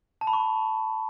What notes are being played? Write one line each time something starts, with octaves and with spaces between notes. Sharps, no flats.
A5
B5
C#6